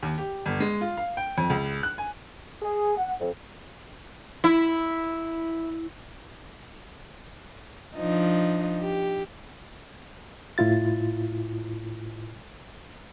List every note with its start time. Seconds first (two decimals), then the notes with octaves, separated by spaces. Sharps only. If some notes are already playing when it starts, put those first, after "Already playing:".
0.03 D#2
0.18 G4
0.46 G1
0.60 G#3
0.81 F4
0.97 F5
1.17 G5
1.38 F2
1.50 C#2
1.83 F#6
1.98 G#5
2.62 G#4
2.97 F#5
3.19 F2
4.44 E4
7.97 F3 D4 D#4
8.80 G4
10.58 A2 E4 F4 A6